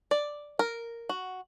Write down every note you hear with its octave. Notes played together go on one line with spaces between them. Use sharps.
D5
A#4
F#4